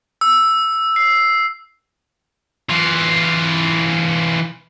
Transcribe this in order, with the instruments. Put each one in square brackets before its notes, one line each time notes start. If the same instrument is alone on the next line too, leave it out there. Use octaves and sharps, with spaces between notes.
[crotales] E6
C7
[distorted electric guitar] E3 F4